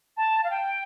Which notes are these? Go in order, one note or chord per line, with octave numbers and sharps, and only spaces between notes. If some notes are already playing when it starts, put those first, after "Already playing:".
A5
F5
G5